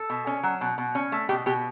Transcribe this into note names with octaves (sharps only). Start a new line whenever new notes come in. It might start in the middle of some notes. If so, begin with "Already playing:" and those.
Already playing: A4
B2
C#4
F#3
B2
B2
C#4
A3
B2 G4
B2 G4